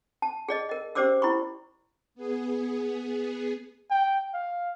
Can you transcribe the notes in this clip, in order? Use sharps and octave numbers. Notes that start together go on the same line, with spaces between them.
A5
G#4 D5 D#5
A#4 D#5
C#4 G4 C5 D5 D6 E6
E4 B5 C#6
B3 G#4
G5
F5